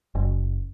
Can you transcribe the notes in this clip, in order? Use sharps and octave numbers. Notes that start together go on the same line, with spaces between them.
F#1